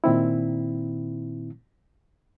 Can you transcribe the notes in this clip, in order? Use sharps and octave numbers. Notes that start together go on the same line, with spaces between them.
A#2 D#3 C4 E4